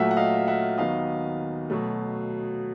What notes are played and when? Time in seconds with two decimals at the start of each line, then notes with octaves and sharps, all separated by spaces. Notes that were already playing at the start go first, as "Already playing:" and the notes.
Already playing: A#2 F#3 A3 E5 F#5
0.11 F#5
0.17 D#5 F5
0.48 E5 F#5
0.78 D#2 D#3 F#3 B3 D#5 F5
1.70 B2 F#3 A3